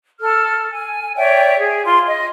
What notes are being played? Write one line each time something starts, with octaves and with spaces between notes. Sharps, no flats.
A4 F6
G#5
C#5 D5 E5 G5
G#4
F4 C6
D#5